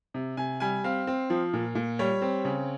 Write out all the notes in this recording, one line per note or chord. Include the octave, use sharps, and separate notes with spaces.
C3
C3 G#5
G3 G#5
C4 F5
C4
F3
A#2
A#2
G3 C#5
C4
C#3